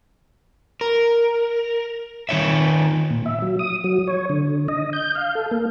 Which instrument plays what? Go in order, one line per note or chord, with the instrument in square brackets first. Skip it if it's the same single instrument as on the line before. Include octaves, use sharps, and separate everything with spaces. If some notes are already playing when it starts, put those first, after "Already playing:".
[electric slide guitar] A#4
D#3 D#4 C#5 E5
[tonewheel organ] A#2
E5
F#3
D#6
F#3
C#5
D3
D#5
G6
F5
A4
A#3